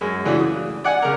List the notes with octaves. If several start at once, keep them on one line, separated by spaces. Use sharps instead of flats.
F#2 G#3
C#3 E3 A3 D4 F#4
D#6
D5 F#5 G#5
C#3 A#4